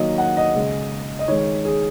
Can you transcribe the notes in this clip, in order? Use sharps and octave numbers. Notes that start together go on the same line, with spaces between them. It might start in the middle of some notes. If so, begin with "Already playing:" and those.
Already playing: D#3 F#3 A#3 D#5
F#5
D#5
C#3 G#3
D#5
D#3 G#3 C#5
G#4